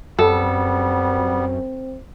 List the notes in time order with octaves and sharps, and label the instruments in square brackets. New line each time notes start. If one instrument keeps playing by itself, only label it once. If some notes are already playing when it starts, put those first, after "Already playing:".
[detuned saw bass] F#2 [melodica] G3 B3 [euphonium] C4 [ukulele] A4